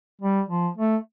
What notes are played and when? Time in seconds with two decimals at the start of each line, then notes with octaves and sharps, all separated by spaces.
0.21 G3
0.49 F3
0.77 A3